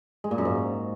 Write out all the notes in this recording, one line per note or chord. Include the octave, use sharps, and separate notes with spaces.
G#3
A#2
F#2
G#2